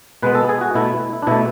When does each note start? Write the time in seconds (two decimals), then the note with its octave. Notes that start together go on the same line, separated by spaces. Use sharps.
0.22 B2 G#3 B3 B4
0.35 A4
0.49 G#4
0.61 F#4
0.74 B2 A3 E4
1.22 D4
1.27 B2 A3 E4